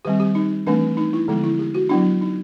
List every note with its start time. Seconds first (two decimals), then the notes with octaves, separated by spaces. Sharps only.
0.05 D#3 G3 C4 G4
0.20 G4
0.35 D#4
0.67 E3 A3 C4 D4
0.97 D#4
1.13 E4
1.28 D3 F3 G#3 B3
1.44 E4
1.59 G4
1.74 F#4
1.89 F#3 B3 D4 E4
2.21 D#4